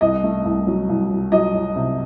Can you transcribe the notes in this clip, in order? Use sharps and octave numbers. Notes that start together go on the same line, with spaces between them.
C2 D#5
A3
C2
F#3
C2
F#3
F#3 D#5
F#3
C3